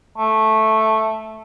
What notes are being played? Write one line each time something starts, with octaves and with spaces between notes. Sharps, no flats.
A3